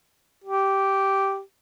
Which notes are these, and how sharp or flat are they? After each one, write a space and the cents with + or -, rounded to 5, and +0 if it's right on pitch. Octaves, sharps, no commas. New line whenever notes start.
G4 -10